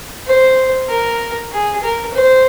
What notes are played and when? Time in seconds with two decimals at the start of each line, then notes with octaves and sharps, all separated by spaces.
0.26 C5
0.89 A#4
1.52 G#4
1.82 A#4
2.14 C5